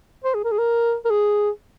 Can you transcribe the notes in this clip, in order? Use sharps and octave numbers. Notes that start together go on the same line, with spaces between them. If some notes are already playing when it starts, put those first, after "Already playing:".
C5
G#4
A#4
G#4
A#4
A#4
G#4